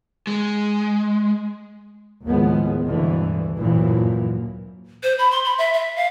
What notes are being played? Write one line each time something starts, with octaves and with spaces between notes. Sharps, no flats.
G#3
D#2 A2 F3 G#3 B3
D2 G2 B2 D3 E3
F#2 A#2 E3 F3
C5
B5
C6
B5
E5
E5
F5